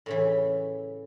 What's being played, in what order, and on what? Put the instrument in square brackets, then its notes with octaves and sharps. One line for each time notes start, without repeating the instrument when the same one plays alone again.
[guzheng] A2 C#3 E3